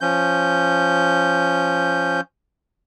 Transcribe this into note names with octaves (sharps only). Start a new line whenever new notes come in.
F3 C#4 G6